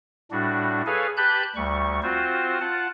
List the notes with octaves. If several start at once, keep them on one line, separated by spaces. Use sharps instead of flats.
A2 G3 D4 F#4
G#4 A4 B4 C#5 F5 G#5
G4 B4 A5 B5 F#6 G6
D2 G3 C#6
C4 F4 F#4 C5
F4 F#5 A5